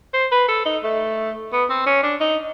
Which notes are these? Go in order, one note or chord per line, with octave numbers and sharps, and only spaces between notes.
C5
B4
A4
D#4
A3
B3
C4
C#4
D4
D#4